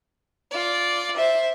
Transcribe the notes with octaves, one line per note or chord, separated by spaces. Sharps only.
F4 D5
C5 E5